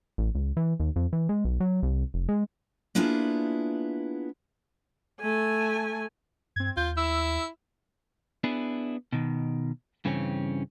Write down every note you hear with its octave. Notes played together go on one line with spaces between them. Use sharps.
A1
C#2
E3
D#2
F2
E3
G#3
B1
F#3
C2
F1
G#3
A#3 B3 D4 E4 F4 G#4
A3 G#5
G2 C4 G#6
D#2 F4 G6
E4 E6
B3 D4 E4 G#4
B2 D#3
G2 C#3 E3 C4 C#4